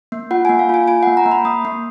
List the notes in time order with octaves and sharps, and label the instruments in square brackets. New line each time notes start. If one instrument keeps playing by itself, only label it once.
[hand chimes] A#3
F4 F#5
A#3 G#5
F5
F4 G#5
F4 G#5
A#3 F#5
A#5
A#3
B5
A#3 D#6
A#3